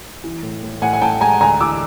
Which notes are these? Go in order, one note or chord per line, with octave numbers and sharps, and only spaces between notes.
E3
A2
A2
A2 F#5 G#5
G#5
A2 G5 A5
G#3 G#5 A#5
D2 G#5 A#5
E3 D6 E6